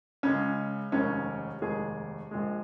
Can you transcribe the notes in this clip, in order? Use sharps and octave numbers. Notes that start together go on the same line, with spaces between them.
C#2 C#3 G#3 C#4
F1 D#2 D#3 G#3 C#4
F1 D#2 D#3 G#3 G#4
A#1 A#2 G#3